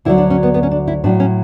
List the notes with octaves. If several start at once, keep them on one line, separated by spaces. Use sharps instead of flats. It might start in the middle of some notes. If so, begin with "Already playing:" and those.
D2 D3 F#3 E4
D4
C#4
B3
B3
C#4
D4
E4
A2 F#3 D4
C#4